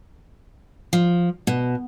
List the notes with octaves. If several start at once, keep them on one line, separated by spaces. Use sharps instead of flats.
F3
B2